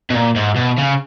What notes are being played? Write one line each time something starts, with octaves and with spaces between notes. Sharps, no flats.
B2
A#2
G#2
B2
C#3